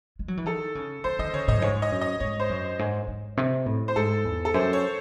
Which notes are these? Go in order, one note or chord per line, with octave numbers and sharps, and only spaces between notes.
G#3
F#3
E3
D#3 A4
C#3
E3 C5
D#3 D#5
C#3 C#5
A2 D#5
F#2
G#2 C#5
D#5
F#2
D#5
G#2 C#5
C5
F#2
G#2
G#2
C3
A2
C5
G#2 A4
E2
A4
F#2 C5
C#5